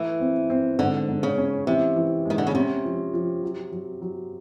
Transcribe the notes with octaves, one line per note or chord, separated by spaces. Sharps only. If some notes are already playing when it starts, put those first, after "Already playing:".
Already playing: E3 A3
C4
C4
G#2 D3
G#2
C#3
C#4
C3 E3
E3
D#3 G#3
D3
C#3
C3 C#4
F3
F3
F#3
F#3
F#3